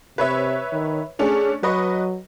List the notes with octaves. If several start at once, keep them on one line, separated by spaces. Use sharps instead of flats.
C3 B4 C#5 E5
D#3
A3 C#4 D4 G#4
F#3 B4 D#5 C#6